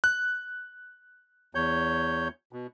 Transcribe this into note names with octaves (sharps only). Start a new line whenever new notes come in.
F#6
E2 C#5 G6
B2